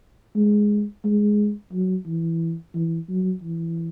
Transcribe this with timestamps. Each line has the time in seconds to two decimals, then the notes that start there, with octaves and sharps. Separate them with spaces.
0.36 G#3
1.04 G#3
1.73 F#3
2.07 E3
2.75 E3
3.09 F#3
3.43 E3